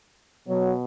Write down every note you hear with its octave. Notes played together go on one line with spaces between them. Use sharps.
B2 F#3